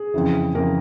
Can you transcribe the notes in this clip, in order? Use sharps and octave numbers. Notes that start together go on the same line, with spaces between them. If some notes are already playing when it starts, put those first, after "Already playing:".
Already playing: G#4
F2 C#3 E3
F2 C#3 E3 A#3 A#4